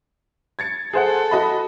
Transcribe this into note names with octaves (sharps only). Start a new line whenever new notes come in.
G#6 A6 C#7
G#4 A4 C5 F#5
F#4 D#5 B5